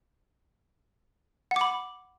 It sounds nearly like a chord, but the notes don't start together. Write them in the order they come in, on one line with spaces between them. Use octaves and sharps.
F#5 D6 B5